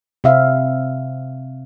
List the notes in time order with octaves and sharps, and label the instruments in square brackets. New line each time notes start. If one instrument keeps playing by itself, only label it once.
[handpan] C3 C4 E5 F5